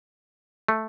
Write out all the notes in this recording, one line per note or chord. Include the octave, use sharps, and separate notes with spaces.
A3